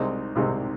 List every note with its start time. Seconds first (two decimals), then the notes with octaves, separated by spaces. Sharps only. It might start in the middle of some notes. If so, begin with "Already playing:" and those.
Already playing: C2 C3 G#3 C4 D#4
0.36 C2 C3 G#3 C4 D#4